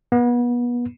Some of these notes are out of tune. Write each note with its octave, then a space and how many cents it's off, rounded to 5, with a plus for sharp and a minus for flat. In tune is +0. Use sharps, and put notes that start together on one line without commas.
B3 -30